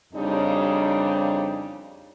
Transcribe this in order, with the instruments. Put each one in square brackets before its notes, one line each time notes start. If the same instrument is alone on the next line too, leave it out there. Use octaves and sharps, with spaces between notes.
[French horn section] F2 C#3 G3 D4 D#4